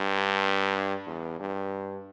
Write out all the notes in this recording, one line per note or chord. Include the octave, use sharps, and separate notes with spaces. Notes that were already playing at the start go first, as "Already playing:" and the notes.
Already playing: G2
E2
G2